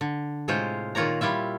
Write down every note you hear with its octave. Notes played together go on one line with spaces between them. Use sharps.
D3
A2 C3 G#3 F4 C5 C#5
A#2 D#3 F4 C#5 D5 A#5
G3 E4 F4 E5